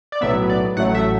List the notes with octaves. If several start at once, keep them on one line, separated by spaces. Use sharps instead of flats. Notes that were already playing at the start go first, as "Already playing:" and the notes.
D5
B1 A2 F#3 B3 E5
D5
A1 A2 F#3 A3 F#5
E5